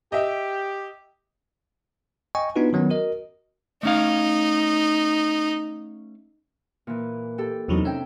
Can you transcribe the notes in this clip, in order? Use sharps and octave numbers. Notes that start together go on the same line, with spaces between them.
G4 D#5 E5
D#5 G5 G#5 C#6
B3 D4 D#4 F4 F#4 B4
D#3 F#3 B3 C#4
F#4 A#4 D#5
A3 C#4 D#4 F5
A#2 E3
G4 A4
E2 C3 E3 F#3 D4 D#4
C#4 E5 G5